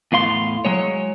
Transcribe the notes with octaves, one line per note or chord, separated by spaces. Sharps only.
E2 A2 F5 C6
F#3 G#3 C#5